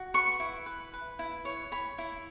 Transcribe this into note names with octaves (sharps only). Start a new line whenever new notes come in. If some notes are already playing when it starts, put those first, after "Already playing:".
Already playing: F#4
B4 C#6
E4
B4
B4
E4
C#5
C#5 B5
E4